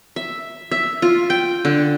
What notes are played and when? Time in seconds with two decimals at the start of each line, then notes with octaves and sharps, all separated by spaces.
0.16 E5
0.71 E5
1.02 F4
1.30 G5
1.65 D3